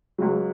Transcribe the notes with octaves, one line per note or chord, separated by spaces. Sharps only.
C#2 C#3 F#3